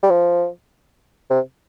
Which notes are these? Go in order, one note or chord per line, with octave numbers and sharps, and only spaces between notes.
G3
F3
C3